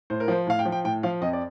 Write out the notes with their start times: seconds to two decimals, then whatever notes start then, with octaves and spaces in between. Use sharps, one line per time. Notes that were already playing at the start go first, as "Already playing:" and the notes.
0.10 A2 C5
0.20 A#4
0.28 F3 C5
0.47 A2 F5
0.59 G5
0.65 F3
0.72 G5
0.84 A2 G5
1.03 F3 F5
1.21 F2 D#5
1.33 D5